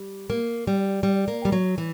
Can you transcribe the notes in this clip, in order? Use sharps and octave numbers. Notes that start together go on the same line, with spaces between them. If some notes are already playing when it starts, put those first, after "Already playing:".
Already playing: G3
A#3
G3
G3
A#3
G3
F#3
E3